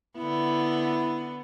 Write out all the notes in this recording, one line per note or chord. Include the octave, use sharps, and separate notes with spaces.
D3 B3 E4